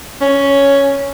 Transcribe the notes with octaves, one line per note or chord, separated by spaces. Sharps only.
C#4